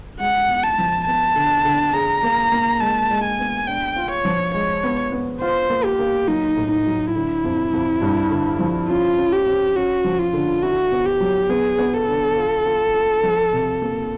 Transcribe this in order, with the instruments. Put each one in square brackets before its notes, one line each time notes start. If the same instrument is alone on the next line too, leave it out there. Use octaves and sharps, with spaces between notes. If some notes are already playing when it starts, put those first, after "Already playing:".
[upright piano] G#3 [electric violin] F#5
[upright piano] E2
[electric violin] A5
[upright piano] F3
[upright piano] B3 [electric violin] A5
[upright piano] D3
D3
[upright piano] G#4 [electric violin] A#5
[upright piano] A#3
A#3
[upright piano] G#3 [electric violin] A5
[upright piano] G#3
[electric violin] G#5
[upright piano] B3
[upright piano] D4 [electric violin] G5
[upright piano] F4
[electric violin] C#5
[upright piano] F3
[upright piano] G#3 [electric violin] C#5
[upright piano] B3
B3
[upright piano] F4 [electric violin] C5
[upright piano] A#3
[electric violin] G4
[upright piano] A#3
[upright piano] F#3 [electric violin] D#4
[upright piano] A2
[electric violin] D#4
[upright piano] F#3
[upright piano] D3 [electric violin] E4
[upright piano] F2
F2
G2
D3
F3
[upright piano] C#4 [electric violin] F4
[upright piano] C#4
[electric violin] G4
[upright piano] C#4
[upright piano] C#4 [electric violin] F#4
[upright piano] F3
[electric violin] F4
[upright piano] D3
[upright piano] E4 [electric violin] F#4
[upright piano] B3
[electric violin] G4
[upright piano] F#3
[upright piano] B3 [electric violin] G#4
[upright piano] B3
[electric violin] A4
[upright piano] D3
F4
F4
F4
F3
C3
A#3